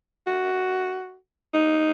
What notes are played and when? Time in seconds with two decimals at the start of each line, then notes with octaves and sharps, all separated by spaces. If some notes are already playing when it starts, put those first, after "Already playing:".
0.27 F#4
1.54 D#4